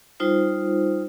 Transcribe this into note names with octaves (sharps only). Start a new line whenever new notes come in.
G3 D#4 F4 C5